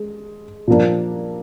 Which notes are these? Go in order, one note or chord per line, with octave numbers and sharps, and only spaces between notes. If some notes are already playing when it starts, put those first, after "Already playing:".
Already playing: G#3
A#2 F3 A#3 D4